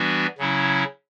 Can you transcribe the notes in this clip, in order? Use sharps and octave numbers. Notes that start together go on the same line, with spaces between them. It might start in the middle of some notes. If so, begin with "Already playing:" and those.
Already playing: E3 G3 B3 D4 F#4
C#3 F#3 C#4 E4